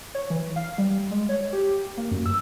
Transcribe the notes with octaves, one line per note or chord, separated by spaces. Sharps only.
C#5
E3
F5
G3
G#3
C#5
G4
A#3
F#2
E6